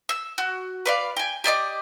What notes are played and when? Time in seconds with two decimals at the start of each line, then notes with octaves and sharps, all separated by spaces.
0.09 E6
0.38 F#4
0.86 B4 D5 F5
1.17 G5 G#5
1.44 G4 D5 D#5 D6